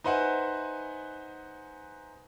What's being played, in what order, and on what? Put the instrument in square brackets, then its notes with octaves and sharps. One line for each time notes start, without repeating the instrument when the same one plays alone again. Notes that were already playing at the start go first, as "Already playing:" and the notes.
[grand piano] D#4 B4 C5 E5 F#5 G#5